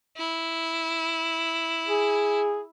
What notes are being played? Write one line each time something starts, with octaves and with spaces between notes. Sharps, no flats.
E4
G#4